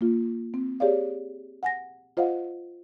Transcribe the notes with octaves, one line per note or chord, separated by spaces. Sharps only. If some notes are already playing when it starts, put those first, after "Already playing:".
A#3 F4
C4
G4 G#4 C#5 D5 F5
F#5 G#5 A#6
F4 C5 D#5 F5 F#5